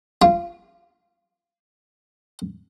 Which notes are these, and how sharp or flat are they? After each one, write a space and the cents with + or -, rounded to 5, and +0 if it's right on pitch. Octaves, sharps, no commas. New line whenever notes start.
F4 -20